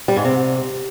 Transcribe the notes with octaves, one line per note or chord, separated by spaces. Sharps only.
G3
G#2
C3